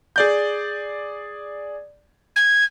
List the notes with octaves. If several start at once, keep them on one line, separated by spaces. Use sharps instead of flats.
G#4 D5 G6
G#6